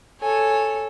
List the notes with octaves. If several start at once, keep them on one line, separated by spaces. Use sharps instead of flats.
A4 C#5 G#5